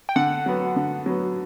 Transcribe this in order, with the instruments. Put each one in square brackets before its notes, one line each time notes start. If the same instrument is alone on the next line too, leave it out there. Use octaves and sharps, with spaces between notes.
[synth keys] G5
[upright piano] D3 [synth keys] F#5
[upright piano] F#3 B3
D3
F#3 B3